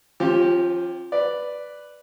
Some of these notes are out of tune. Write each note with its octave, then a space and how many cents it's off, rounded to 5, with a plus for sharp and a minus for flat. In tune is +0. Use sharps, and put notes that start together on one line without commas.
F3 +0 C#4 -45 G4 +0
B4 +0 D5 +0